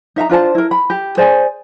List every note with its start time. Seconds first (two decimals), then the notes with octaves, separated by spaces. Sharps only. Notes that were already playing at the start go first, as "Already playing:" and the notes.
0.16 D#4 E5 F5 A#5
0.29 D4 F4 C5 A5
0.55 E4 A#4
0.71 B5
0.90 G4
1.17 G#4 C5 D5 G#5